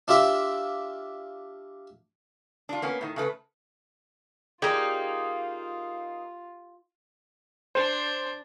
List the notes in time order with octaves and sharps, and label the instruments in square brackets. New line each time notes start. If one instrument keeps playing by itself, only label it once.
[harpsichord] D4 F4 G4 E5 D6
[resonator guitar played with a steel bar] D4 F4
A#3 B3 C#4
A2 D#3
C#3 A3 B4
[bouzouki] A#3 D#4 [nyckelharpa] F4 [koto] G4 [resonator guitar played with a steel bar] G#4 D5
[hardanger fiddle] D4 [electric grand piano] C5